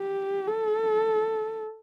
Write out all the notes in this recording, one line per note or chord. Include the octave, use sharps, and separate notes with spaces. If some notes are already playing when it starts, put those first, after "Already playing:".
Already playing: G4
A4